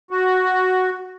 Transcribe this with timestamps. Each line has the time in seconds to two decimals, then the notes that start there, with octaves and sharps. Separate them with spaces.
0.11 F#4